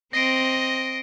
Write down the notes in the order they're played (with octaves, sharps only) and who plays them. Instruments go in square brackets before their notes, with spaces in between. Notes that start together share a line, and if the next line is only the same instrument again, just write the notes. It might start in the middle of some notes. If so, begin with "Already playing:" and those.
[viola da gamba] C4 [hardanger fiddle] D#5 [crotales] A#6 C7 D7